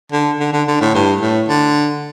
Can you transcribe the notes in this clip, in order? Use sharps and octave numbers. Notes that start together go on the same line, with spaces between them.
D3
D3
D3
D3
A2
G2
A2
D3